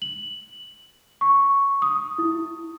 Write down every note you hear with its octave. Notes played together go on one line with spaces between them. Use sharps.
F#7
C#6
D#6
E4